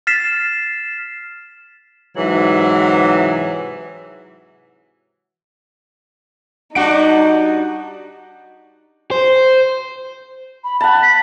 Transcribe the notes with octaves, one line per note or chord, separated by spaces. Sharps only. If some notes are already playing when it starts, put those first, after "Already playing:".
F6 A6 B6 C7 E7
G#2 C3 E3 F#3
G3 D4 D#4 F#4 F#5 D7
C5
B5
F#5 A5 B5
B6